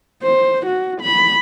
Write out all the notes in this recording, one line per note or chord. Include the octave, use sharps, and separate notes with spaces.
C5
F#4
B5